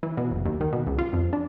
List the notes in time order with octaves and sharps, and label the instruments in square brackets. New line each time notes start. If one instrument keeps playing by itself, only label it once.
[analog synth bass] E3
B2
F#1
D#2
D#3
B2
C#2
F4
F2
D4